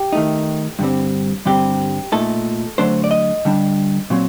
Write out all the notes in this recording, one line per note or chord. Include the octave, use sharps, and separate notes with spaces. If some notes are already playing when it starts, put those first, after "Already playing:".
Already playing: G4
D#3 A3 D#4
G2 D3 G3 C4
G2 D3 G3 C4 G4
A#2 A3 D#4 A4
D3 F#3 A3 D4 C5
D5
D#5
D3 G3 D4
A#2 F#3 C4